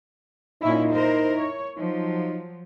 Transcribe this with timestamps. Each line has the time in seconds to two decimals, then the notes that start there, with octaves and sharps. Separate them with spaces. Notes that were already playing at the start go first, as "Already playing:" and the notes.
0.62 A#2 C#4 D#4 E4
0.92 E4 A#4 C5
1.38 C#5
1.77 F3 F#3 D#4